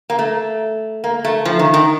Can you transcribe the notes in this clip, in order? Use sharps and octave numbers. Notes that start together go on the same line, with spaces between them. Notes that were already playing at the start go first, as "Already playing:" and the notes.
A#3
A3
A#3
A3
F3
D#3
D#3